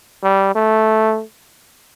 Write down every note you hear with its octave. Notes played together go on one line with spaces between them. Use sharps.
G3
A3